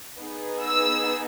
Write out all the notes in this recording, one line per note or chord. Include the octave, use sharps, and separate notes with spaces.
B3 D#4 G#4
E6